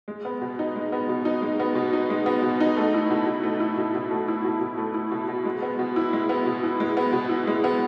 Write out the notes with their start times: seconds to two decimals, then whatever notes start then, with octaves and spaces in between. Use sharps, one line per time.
0.08 G#3
0.25 B3
0.41 B2
0.59 D#4
0.76 G#3
0.92 B3
1.09 B2
1.25 D#4
1.42 G#3
1.60 B3
1.75 B2
1.93 D#4
2.10 G#3
2.26 B3
2.43 B2
2.60 D#4
2.77 A3
2.94 E4
3.10 B2
3.27 B2
3.43 A3
3.60 E4
3.77 B2
3.95 B2
4.11 A3
4.28 E4
4.44 B2
4.61 B2
4.77 A3
4.94 E4
5.11 B2
5.28 B2
5.45 G#3
5.62 B3
5.79 B2
5.96 E4
6.13 G#3
6.29 B3
6.46 B2
6.63 E4
6.80 G#3
6.97 B3
7.12 B2
7.29 E4
7.47 G#3
7.64 B3